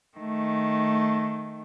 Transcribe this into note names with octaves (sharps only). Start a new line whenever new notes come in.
D#3 A3